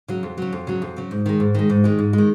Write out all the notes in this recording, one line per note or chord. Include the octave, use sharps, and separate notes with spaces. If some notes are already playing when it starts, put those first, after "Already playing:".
C#3 F#3
F2
C#3 F#3
F2
C#3 F#3
F2
C#3 F#3
G#2
D#3 G#3
G#2
D#3 G#3
G#2
D#3 G#3
G#2
D#3 G#3